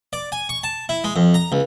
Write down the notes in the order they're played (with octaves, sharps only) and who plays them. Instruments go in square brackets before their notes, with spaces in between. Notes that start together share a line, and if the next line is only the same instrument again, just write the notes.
[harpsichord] D5
G#5
C#6
A5
E4
G#3
F2
A#5
C#2